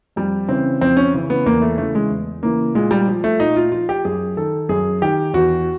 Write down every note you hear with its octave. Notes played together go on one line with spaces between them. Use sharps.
F2 G3
C#3 E3 C4
F2 C4
C#4
C#3 E3
B3
E2 A#3
A3
C#3 E3 A3
G#3
E2
C#3 E3 A#3
A#2 G#3
G3
F3
A3
A#2 D#4
F4
F3 F4
G4
F#2 G#4
D#3 A4
F#2 G#4
D#3 G4
E2 F#4